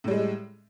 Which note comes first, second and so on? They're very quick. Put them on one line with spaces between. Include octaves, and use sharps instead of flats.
A2 G3 G#3